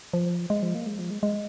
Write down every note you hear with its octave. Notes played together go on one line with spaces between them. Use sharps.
F3
G#3
F3
A#3
G#3
F3
G#3
G#3